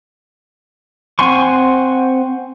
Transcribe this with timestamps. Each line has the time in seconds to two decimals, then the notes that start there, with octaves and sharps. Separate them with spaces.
1.19 C4 F#5 G#5 C6 C#6